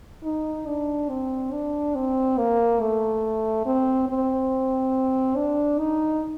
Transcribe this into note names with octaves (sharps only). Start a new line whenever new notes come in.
D#4
D4
C4
D4
C4
A#3
A3
C4
C4
D4
D#4